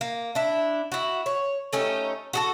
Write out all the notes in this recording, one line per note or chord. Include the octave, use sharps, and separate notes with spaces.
A#3
D4 E4
E4 F#4
C#5
A3 C#4 D#4 G4
F#4 G#4 A4